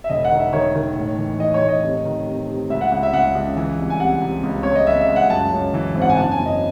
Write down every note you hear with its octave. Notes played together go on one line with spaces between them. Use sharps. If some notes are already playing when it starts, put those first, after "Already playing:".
E5
E1 D#5
F#5
D#3
E5
D#3 C#5
D#3
A2
E3
E3 D#5
C#5
A2
D#5
C3
D#3
C3
C3
C#2 E5
F#5
C#2 F#5
E5
C#2 F#5
C#2
E3
C2
G#5
C3 F#5
C3
C#2
C#2 C#5
D#5
C#2 E5
E5
C#2
F#5
F#2 A5
F#2
E3
G#1
F#5
G#5
F#1 A5
G#5
F#2
D#5